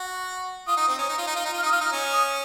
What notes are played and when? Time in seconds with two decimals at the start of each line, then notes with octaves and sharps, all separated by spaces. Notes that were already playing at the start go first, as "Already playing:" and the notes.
Already playing: F#4
0.67 F4 D#6
0.77 D#4
0.88 C4
0.98 C#4
1.09 D#4
1.18 F4
1.27 D#4
1.36 F4
1.45 D#4
1.53 F4
1.58 F6
1.62 D#4 D#6
1.72 F4 F6
1.81 D#4
1.92 C#4
2.13 D#6